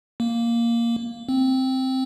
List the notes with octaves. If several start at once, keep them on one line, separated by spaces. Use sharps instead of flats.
A#3
C4